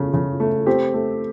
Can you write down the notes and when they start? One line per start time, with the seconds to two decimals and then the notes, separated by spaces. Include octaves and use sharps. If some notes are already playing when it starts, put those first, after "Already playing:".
Already playing: C#3 A3
0.13 C#3
0.40 A3
0.67 C4 G4
0.94 A3